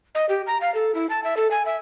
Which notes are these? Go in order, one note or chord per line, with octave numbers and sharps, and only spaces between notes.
D#5
G4
A#5
F5
A4
E4
A5
E5
A4
G#5
E5